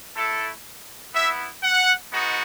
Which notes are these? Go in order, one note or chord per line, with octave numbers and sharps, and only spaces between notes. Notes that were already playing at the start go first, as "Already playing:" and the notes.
A3 E4 A4
B3 E4 E5
F#5
G#3 B3 D#4 F#4